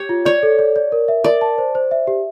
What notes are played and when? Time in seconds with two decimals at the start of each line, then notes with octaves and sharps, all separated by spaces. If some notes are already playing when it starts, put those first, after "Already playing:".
Already playing: G4 C#5
0.09 F4
0.25 C#5 D5
0.43 A4
0.59 D5
0.76 D5
0.92 A#4
1.08 E5
1.24 A#4 D5
1.41 A5
1.58 C5
1.75 C5
1.91 E5
2.07 G4